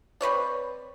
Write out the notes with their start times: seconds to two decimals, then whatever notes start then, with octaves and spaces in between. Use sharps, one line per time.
0.21 C4 B4 C#5 D5